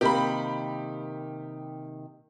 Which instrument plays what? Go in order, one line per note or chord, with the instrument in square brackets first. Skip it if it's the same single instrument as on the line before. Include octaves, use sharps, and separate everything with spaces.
[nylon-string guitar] C3 D#3 A#3 [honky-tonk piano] G4 B5